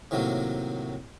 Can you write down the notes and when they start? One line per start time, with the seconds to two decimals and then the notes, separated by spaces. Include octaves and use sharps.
0.11 A2 C3 D#3 F#3 A#3